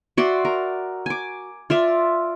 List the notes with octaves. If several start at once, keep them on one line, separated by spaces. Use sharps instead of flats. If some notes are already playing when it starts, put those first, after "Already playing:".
F#4 D5 E5 C6
A#4
G#5 D6
F4 D5 E5